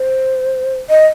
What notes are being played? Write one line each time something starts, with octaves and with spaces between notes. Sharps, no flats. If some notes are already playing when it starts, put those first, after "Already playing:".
Already playing: C5
D#5